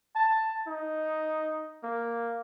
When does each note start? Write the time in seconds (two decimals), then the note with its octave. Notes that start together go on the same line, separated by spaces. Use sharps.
0.16 A5
0.67 D#4
1.83 A#3